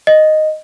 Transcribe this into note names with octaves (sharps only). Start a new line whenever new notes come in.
D#5